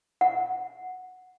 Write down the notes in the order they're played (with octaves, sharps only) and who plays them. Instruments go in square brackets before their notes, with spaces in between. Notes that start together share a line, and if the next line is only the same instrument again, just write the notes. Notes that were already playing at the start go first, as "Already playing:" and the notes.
[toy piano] F#5